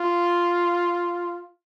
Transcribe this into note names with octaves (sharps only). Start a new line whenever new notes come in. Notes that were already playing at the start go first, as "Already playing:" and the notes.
Already playing: F4